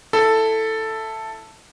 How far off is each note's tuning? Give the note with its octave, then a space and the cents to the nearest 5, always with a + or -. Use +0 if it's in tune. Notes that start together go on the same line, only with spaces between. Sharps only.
E4 +0 A4 +5